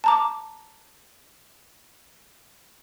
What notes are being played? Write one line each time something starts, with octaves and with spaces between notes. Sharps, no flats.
A5 A#5 D6